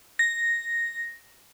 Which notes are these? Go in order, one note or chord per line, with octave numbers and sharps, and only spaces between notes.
A#6